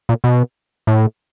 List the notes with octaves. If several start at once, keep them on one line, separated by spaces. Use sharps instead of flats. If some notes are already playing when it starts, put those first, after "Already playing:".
A#2
B2
A2